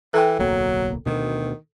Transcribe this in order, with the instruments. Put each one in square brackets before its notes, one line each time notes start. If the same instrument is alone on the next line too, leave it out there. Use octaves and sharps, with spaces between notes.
[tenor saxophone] E3 [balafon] A4 G5
[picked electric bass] D1 B1 A#3 [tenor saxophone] F#3
[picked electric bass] D2 B2 [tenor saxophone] D#3